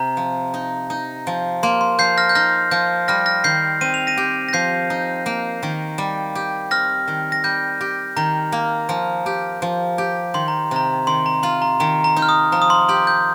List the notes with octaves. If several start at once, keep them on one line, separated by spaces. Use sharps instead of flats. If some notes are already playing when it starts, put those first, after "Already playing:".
Already playing: C3 A#5
F3
D#4
D#4
F3
A#3 C6
C6
F3 G6 C7
F6 A#6
G6
D#4 F6 A#6
F3 G6
G3 F6 A#6
F6 A#6
D#3 G6 C7
C4 D#7
F7
A#6 D#7
G4
A#6
F3 G6 C7
D#4
A#3
D#3
G3
G4
C4 F6 A#6
D#3
A#6
G3 G6
G4
D#3 A#5
A#3
F3
G4
F3
G4
D#3 C6
A#5
C3 A#5
D#3 C6
A#5
F4 C6
A#5
D#3 A#5
A#5
D#4
F6
D#6
F3 A#5
D#6
C6
G4 C6
G6